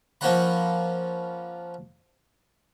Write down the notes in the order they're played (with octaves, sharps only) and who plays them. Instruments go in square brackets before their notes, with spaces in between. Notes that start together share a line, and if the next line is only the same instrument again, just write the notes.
[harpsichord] F3 A#3 C#4 C5 F#5 B5